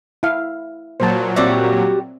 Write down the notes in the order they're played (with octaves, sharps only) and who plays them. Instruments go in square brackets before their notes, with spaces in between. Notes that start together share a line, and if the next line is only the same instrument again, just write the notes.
[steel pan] E4 F5
[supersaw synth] A#2 F#3 [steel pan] C5 A5
[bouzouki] G3 F#4 G4 [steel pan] C4 D5 E5